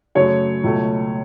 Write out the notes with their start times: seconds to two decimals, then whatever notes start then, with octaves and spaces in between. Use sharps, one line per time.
0.15 F#2 C#3 F#3 A3 C#5
0.64 C#2 B2 F#3 A3